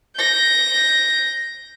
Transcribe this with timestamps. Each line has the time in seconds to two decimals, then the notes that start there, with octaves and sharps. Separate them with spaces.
0.17 G6 A#6